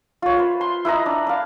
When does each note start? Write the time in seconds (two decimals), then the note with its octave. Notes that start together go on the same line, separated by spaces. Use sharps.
0.22 F4 C#5
0.37 B4 C5
0.61 C6
0.85 E4 B4 D#5 A#5
1.06 D4
1.27 D4 F5